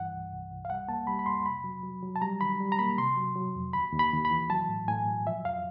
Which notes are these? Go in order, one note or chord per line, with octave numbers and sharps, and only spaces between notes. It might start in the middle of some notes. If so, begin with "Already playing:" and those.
Already playing: G2 E3 F#5
C2
C2
C2
F5
G3 F#5
A#3 A5
G3 B5
B5
F2 C6
C3 B5
F#3
F#3
F#3
A5
G3 A#5
D#3 B5
G3
A#5
A#3 B5
C3 C6
F#3
F#3
F2
D#2 B5
D#2
B5
D#2
B5
E3
F#3 A5
A2
A2 G#5
F#3
F3 E5
F2 F5